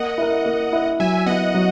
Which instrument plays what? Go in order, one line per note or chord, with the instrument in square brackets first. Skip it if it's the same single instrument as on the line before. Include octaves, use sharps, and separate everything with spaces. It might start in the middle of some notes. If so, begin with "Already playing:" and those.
Already playing: [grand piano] A#3 [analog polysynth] D#5 F#5
[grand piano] E4 A#4
A#3
E4 A#4
[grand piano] F#3 [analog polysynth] E5 G#5
[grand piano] B3 E4 [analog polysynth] D#5 F#5
[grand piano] F#3